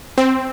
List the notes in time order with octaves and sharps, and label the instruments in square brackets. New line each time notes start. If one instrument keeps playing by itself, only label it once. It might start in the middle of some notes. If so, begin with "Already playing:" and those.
[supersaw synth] C4